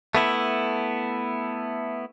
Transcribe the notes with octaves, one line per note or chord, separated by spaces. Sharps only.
A3 B3 E4